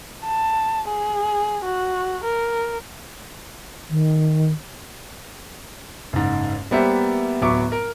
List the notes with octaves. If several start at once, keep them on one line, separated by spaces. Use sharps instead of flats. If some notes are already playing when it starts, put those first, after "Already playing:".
A5
G#4
F#4
A#4
D#3
F#1 G#2
G3 A#3 B3 G4 C5 E5
D1 F#3 B3 E5 C#6 D6
A#4